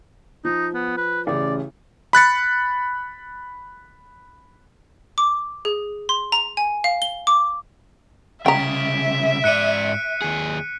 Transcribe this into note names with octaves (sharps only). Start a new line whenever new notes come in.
F3 D#4
B3
B4
A1 C#3 D5
B5 F#6 A6 C#7
D6
G#4
C6
A#5
G#5
F5
G7
D6
C2 C#3 E5 G5 A#5 B6 D7
G#2 D5 F#6 C#7 D#7
D#2 G#4